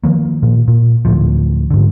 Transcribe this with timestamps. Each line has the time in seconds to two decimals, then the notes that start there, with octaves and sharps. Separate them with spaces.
0.04 D#3 F3 A#3
0.43 A#2
0.68 A#2
1.05 D2 A2 F3
1.71 G#2 D3